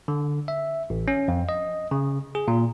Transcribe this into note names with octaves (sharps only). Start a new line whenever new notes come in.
D3
E5
A1
C#4
F2
D#5
C#3
G#4
A#2